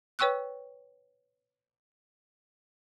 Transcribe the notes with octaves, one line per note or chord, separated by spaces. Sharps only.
B4 C#5 G5 C#6 E6 F#6